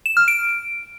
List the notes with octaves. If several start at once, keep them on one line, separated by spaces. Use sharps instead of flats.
E7
F6
D7